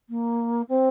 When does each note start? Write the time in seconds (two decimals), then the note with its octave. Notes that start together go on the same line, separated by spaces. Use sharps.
0.09 A#3
0.68 C4